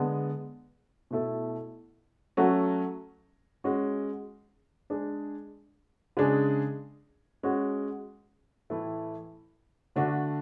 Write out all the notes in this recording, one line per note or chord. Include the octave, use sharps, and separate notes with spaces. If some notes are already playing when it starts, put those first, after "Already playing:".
Already playing: D3 G#3 B3
B2 A3 E4 A4
F#3 A3 C#4 F#4 A4
G#3 C#4 F#4
G#3 D4 G#4
C#3 G#3 D4 G#4
G#3 C#4 F#4
A2 E3 A3 E4 A4
D3 A3 D4 F#4